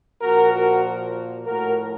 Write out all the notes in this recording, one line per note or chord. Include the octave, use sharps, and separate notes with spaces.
A#2 F3 F#4 A#4
F#4 A#4
A2 F3 F#4 A#4